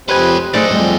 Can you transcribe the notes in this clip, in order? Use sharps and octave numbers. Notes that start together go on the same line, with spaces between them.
F2 C#4 G4 B4 C5 D#5 G#5
F#2 A3 F#4 G#4 A4 C5 D5 D#5
F2 G3 G#3